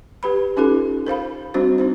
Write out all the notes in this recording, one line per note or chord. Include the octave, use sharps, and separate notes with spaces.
G4 B4 B5
C#4 D#4 F4 G4 A4
A#4 C5 F5 B5
G3 C4 D4 F#4 C5
C4 D#4 C5